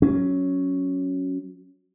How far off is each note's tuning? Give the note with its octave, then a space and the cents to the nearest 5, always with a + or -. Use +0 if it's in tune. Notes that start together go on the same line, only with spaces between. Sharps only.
F#3 +0 C#4 +0